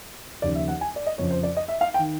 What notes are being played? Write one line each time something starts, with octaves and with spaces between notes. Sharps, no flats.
D#2 C#3 F3 D5
E5
F#5
G#5
D5
D#5
F2 C#3 F3 C#5
C5
D5
D#5
E5
F5
G5
D#3